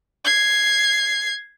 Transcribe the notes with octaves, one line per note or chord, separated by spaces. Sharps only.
G#6 C7